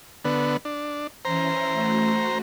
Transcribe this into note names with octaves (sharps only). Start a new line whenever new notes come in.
D3 B3
D4
E3 C#4 E4 C5 A#5
A3 F#4